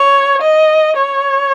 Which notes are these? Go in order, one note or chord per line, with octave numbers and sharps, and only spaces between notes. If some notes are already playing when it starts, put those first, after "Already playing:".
Already playing: C#5
D#5
C#5